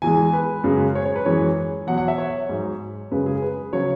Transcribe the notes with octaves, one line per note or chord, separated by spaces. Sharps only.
E2 E3 G#3 G#5
B4
F#2 C#3 G#3
C#5
C#5
B4
F#2 E3 G#3 C#5
E2 B2 F#3 F#5
F#5
E5
C#5
G#2 F#3
F#2 C#3 G#3 B4
G#4
B4
C#3 F#3 C#5